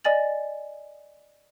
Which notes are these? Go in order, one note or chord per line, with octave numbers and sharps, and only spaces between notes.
D5 D#5 G#5 A6 F#7